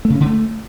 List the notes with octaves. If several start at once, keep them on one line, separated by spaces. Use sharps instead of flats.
A3
C#3
C#4
D3
A3